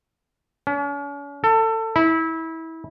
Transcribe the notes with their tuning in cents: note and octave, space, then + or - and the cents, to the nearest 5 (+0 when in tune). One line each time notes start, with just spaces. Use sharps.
C#4 +40
A4 +25
E4 -25